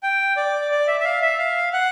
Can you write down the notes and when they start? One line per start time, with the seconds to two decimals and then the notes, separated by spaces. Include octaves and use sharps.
0.03 G5
0.37 D5
0.71 D5
0.87 E5
1.00 E5
1.04 F5
1.22 E5
1.39 F5
1.73 F#5